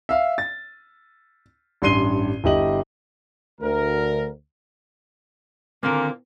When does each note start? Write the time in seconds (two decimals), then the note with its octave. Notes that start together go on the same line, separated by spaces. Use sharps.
0.09 E5 F5
0.38 A6
1.82 A1 G2 C6 C7 D#7 G7
2.44 G1 E4 G4 D#5 F#7
3.61 D2 A#4
5.83 A#2 D3 D#3 A#3 C4